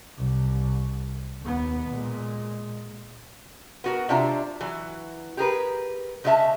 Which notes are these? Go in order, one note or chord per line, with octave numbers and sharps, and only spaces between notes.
C2
D#2 B3
A#2 G#3
B3 F#4 A#4
C3 D4 F4 E5 A#5
E3 F#3
G4 G#4 A#4 B4
C#3 G#3 C#4 F4 E5 A5